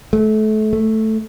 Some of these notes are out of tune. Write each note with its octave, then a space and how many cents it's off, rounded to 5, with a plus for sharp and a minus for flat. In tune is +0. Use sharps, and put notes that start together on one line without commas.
A3 -30
A3 +0